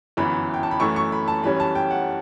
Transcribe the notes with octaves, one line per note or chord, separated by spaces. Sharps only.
G1 F#2 E3 B5
G5
A5
B5
F#2 E3 A3 C#6
C#6
B5
A5
F#2 E3 G3 C#4 B5
A5
G5
F#5